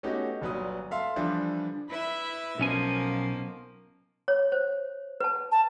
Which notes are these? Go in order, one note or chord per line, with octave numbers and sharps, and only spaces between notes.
A3 B3 C#4 D#4 F#4 G4
G1 A#2 F#3 B4 D#6
A4 E5 F5 C6
D3 E3 F3 G3 D4
E4 B4 E5
B1 B2 F3 A#3 C#4 G#5
C#5
C5
B4 A5
A5